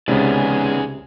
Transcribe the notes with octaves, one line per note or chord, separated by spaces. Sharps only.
C#2 C3 D#3 G#3 B3 C#4 G#4 D5